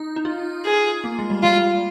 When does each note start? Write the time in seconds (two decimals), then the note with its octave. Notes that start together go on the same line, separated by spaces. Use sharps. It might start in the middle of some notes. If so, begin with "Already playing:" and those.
Already playing: D#4
0.16 D#4
0.25 F4
0.65 G#4
1.04 A#3
1.19 G#3
1.30 G3
1.43 G3 F4